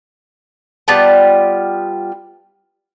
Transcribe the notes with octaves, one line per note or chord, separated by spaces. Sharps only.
G3 B3 F4 A5